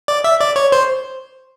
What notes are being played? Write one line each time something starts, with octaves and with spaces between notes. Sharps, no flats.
D5
E5
D5
C#5
C5